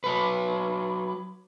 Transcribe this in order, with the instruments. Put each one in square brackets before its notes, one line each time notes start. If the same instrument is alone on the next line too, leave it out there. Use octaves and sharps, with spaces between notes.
[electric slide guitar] F#3 B4